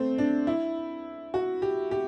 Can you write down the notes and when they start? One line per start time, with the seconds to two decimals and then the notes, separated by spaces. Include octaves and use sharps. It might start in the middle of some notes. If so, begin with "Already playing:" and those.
Already playing: A3 C4
0.18 D4
0.47 E4
1.34 F#4
1.62 G4
1.91 G4